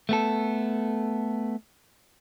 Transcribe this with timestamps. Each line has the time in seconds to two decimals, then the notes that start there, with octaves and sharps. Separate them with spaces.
0.09 A3 B3 A4